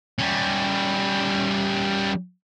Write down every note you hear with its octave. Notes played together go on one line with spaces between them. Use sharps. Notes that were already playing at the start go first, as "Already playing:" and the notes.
G3 C#4